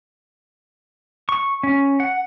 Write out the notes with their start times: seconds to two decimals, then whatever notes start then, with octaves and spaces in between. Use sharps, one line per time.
1.29 C#6
1.63 C#4
2.00 F#5